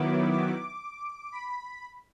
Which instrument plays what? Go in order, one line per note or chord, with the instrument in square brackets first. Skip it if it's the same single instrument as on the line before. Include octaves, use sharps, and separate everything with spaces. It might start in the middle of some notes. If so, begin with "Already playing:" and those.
Already playing: [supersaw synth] D#3 F#3 B3 E4 D6
D6
B5